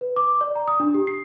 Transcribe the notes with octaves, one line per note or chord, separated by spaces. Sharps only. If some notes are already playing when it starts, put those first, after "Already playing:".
B4
D6
D5
A#5
D#6
D4
G4
C7